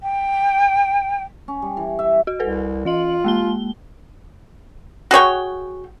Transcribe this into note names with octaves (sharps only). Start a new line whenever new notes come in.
G5
C#4
G3
E3
E5
F#4
C2 A4 B4
E3 F4 D#5 F#7
G#3 A#3 G7
F#4 G#4 C#5 G5